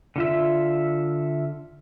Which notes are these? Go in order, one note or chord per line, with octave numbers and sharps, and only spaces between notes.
D3 F4 E5